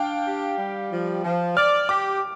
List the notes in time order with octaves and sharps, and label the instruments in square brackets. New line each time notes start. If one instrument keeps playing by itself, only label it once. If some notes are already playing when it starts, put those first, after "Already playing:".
Already playing: [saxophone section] D4 [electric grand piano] F5 G5
[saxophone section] G4
G3
F3
F3
[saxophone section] D5 [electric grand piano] F6
[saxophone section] G4 [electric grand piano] D6